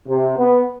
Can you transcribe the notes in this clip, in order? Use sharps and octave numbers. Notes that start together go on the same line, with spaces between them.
C3
B3